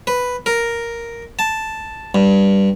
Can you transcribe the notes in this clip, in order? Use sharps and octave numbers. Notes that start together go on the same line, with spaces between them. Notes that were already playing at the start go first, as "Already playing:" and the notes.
B4
A#4
A5
G2